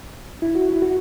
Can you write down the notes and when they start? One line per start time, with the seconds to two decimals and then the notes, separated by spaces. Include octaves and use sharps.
0.42 E4
0.55 F#4
0.69 E4
0.82 F#4